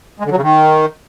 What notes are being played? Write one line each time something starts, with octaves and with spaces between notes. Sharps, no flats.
G#3
D3
F#3
C#3
D#3